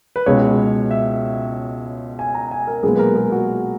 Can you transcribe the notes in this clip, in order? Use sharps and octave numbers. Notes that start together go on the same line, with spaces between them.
B4
C#2 B2 G#3 C#5
E5
G#5
A#5
G#5
A#4
B1 A#2 G#3 B3 G#4
B4
A#4
G#4
F#4